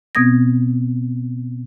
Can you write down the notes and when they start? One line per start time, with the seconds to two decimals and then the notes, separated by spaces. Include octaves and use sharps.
0.15 B2 B3 C4 D#6 G#6 A#6